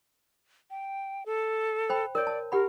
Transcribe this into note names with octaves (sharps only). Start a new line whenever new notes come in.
G5
A4
C5 G5 B5
A#4 C#5 D5
A5
G4 A#4 F#5 B5